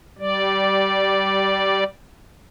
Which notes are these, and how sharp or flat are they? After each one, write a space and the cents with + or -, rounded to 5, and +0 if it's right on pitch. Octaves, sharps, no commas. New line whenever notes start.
G3 -20 D5 +0